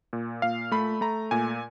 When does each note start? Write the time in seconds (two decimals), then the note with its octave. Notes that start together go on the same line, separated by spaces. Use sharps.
0.13 A#2
0.42 A#2 F5
0.72 A3 B5
1.01 A3 A#5
1.31 A#2 G#5